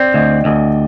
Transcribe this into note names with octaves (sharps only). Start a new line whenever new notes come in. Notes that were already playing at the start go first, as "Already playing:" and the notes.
Already playing: C4 D5 G5
D2 D#5
D2 D#5